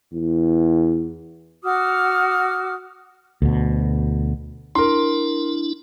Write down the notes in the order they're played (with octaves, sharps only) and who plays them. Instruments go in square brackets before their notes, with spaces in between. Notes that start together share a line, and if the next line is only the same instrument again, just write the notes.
[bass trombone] E2
[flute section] F#4 D6 D#6 F6
[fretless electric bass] D2 B2
[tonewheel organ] D4 E4 [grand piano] A#4 C6